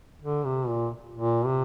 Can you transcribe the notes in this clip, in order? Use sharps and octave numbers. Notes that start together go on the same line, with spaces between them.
D3
C3
A#2
A#2
C3